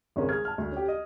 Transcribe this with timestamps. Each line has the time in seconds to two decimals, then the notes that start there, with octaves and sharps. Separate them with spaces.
0.16 G#1 C#2 C#4 A#4
0.29 G#4 F6 G#6
0.45 A5 F6
0.58 D2
0.72 C#4 G4
0.88 D#5